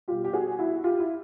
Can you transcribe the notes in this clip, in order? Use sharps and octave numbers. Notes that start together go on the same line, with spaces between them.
B2 G3 F4 G4
G4
F#4 G#4
E4 F#4
F4 G4
E4